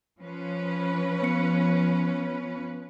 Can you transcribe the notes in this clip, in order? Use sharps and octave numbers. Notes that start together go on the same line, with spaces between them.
F3 C#4 B4
B3 C#7